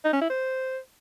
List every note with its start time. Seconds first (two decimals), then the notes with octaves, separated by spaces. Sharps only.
0.05 D#4
0.13 C#4
0.21 E4
0.30 C5